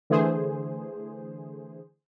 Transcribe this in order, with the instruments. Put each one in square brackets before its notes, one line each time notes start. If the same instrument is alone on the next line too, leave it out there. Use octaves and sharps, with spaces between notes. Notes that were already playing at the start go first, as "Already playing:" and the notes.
[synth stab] D3 E3 A3 G#4 C5